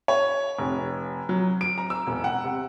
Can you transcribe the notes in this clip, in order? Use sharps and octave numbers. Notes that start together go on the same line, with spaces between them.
C#5
F1
F#3
D7
A#5
E6
E1
F#5
C3